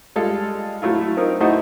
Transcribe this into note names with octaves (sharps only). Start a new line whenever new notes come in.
G3 G#3 F4 A4 F5
F#3 A3 E4 F4
C4 D#4 F4 A#4
A3 D#4 E4 F#4 C5 D#5